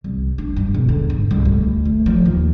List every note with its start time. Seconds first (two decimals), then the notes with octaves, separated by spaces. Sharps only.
0.04 C2
0.38 D4
0.56 G2
0.74 E1
0.89 D3
1.10 G#2
1.31 C2
1.45 D2
1.85 A3
2.06 F3
2.25 D#2